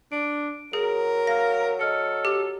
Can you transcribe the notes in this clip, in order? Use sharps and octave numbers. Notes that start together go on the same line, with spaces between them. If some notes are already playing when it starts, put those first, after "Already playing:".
D4 D7
F#3 G#4 A#4
F5 F6 A#6
A4 D#5 F6 C#7
G4